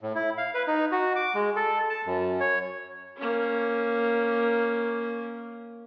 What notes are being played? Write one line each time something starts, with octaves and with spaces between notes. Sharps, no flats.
A2
E4
F5
B4
D#4
F#4
D6
G#3
A4
A5
F#2
C#5
A#3 C#4